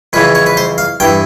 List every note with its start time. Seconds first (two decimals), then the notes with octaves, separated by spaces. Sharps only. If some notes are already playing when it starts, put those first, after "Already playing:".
0.13 F2 C#3 E3 B4
0.35 C#5
0.46 B4
0.57 C5
0.78 F5
1.00 G2 E3 G5